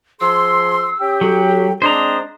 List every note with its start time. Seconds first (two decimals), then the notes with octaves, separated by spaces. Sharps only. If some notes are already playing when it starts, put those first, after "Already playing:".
0.20 F3 G#4 C6 E6
1.00 C#4 G4 G5
1.21 F#3 A4
1.48 A4
1.82 G#3 C4 D4 C5 A#5 D#6